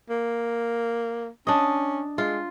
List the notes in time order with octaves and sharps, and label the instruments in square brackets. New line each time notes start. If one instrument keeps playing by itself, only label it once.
[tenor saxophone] A#3
[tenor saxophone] C#4 [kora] D4 D#5
[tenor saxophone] G#3 [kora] F4